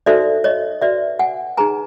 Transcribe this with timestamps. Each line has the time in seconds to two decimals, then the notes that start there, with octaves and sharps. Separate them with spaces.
0.06 D#4 F#4 A4 C5 D5 E5
0.44 C#5 D#5
0.81 F#4 B4 D5 E5
1.19 F#5 G#5
1.57 D#4 G#4 B4 G#5 A#5